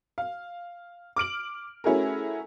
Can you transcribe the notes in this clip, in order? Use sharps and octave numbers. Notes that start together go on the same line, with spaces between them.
F5
D6 F6 D7 F#7
A3 C#4 E4 F#4 G#4 A#4